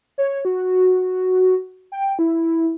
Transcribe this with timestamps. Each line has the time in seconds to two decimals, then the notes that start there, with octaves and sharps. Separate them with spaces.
0.18 C#5
0.45 F#4
1.92 G5
2.19 E4